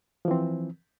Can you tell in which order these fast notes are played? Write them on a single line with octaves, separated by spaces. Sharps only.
F3 E3 C4